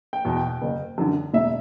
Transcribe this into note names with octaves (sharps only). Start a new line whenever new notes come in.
G5
E2 B2
G5
F#1
F#2 D3
E1 E5